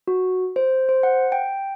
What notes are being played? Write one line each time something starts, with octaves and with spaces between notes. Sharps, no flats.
F#4
C5
C5
F#5
G5